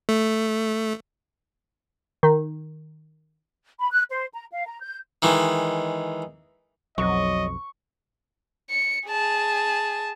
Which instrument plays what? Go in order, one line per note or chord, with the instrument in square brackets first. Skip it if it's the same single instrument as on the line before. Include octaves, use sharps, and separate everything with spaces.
[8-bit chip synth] A3
[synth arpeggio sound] D#3
[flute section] B5
F#6
C5
A#5
F5
A#5
G6
[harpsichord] D#3 E3 G#3
[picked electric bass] B1 F2 [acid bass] F#3 [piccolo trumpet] D#5 [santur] C#6
[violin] C#7
G#4 A5